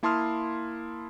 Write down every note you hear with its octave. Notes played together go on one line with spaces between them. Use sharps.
A#3 E4 A5 C6 D#6 F6